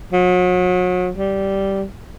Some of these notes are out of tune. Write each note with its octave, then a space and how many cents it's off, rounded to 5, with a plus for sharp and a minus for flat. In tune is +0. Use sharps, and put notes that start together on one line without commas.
F#3 -35
G3 -10